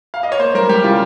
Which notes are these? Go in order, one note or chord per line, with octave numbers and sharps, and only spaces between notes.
F5
D#5
C#5
A#3 C5
G3 A#4
G3 G4
C#3 F4